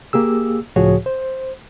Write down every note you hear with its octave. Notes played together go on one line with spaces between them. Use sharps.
A#3 G4 G#4 E6
C#2 A2 F3 F#4 G#4 C#5
C5